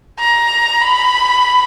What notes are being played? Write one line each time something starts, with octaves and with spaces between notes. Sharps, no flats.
A#5
B5